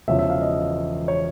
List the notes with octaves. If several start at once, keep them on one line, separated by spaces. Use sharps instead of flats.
E1 E2 C#3 F3 E5
E5
F5
D#5
C#5